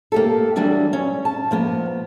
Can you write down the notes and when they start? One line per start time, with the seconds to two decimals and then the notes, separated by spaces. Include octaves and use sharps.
0.12 A#3 G4 A4
0.56 E3 F#3 G3 D4 F#4
0.93 C#4
1.25 A5
1.51 F3 A#3 B3